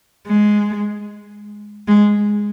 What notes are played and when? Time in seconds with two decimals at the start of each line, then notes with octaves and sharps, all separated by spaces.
0.27 G#3
1.88 G#3